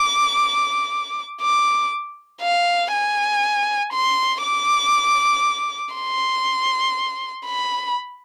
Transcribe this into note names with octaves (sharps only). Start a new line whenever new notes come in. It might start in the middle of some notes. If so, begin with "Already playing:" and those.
Already playing: D6
D6
F5
G#5
C6
D6
C6
B5